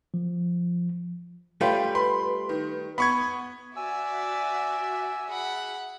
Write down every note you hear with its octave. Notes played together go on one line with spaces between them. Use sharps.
F3
G3 A3 C#4 F4 B4 G5
B4 B5 C6
D#3
B3 B5 C#6 G#6
F#4 D5 E5 G#5 E6
G#4 F#5 B5